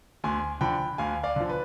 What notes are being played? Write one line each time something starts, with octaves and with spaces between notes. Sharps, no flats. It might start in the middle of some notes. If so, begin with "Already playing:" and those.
D2 G#5 C6
D3 F3 G5 B5
D2 F5 G#5
D5 F5
D3 F3
B4